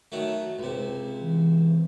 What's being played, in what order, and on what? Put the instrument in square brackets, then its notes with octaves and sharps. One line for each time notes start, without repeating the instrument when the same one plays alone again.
[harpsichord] D#3 F#3 A3
C#2 C3
[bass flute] E3